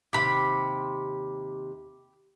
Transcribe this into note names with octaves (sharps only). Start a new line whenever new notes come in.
D#2 C3 G4 B5